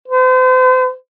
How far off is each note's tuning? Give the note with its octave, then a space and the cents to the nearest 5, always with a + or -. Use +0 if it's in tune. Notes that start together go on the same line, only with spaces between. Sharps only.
C5 -40